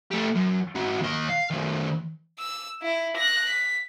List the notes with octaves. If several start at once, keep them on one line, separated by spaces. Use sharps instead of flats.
A3 G4
F#2
G#2 F#4
D#2 D#5
F5
D#3 A3
E6
E4
F#6 A#6
B6